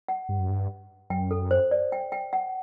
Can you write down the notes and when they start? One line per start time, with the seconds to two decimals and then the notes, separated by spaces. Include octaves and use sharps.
0.08 F#5
0.29 G2
0.39 F#2
0.49 G2
1.10 F#2 G5
1.31 A4
1.51 C5
1.71 D5
1.92 G5
2.12 G5
2.33 F#5